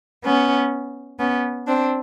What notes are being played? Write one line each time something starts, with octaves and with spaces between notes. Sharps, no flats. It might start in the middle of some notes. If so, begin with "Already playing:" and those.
B3 C#4
B3 C#4
C4 D4